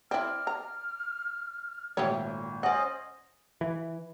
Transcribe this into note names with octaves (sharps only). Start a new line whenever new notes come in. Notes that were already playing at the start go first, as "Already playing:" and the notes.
C4 E4 D5 F6
A#5
G#1 A#2 A3 G4 C#5
C#4 C5 D5 D#5 F#5
E3